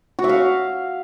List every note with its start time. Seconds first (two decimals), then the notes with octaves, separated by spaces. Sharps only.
0.19 F#4
0.24 E5
0.29 F5